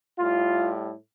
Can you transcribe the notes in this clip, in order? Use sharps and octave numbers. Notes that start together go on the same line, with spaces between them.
A2 G3 F4